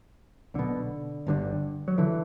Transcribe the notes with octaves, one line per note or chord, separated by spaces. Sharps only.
B1 B2 D3
G1 G2 D3
F#3
D3 E3